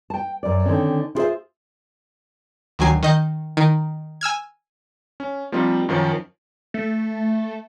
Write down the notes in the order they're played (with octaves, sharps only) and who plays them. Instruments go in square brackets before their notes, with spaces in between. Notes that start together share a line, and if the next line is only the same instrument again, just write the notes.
[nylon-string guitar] G5 A5
F#2 D5
D3 D#3 C4 C#4
E4 F4 G#4 A4 C5 E5
[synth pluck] D2 D#3 F#3 G#5 C7
D#3 D#5 G6
D#3
G#5 E6 F6 G#6
[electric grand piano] C#4
F3 G3 A#3 C4 D#4 F4
F#2 D#3 F3 C#4
[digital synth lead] A3